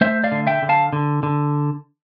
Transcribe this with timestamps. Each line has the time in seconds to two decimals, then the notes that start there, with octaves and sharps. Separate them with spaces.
0.01 A3 C5 E5
0.24 D5 F5
0.32 D3
0.47 E5 G5
0.62 D3
0.69 F5 A5
0.93 D3
1.23 D3